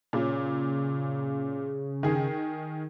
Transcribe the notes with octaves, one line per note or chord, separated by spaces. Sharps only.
A#2 C#3
D#3 G#4